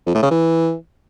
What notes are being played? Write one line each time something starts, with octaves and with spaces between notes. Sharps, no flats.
F2
A2
C#3
E3